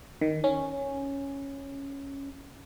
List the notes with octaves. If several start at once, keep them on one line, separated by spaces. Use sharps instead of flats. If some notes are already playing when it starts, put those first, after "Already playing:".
D#3
C#4